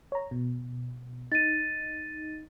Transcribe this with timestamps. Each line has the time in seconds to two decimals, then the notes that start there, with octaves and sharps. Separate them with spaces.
0.12 C#5 A#5
0.31 B2
1.32 D#4 A6 D#7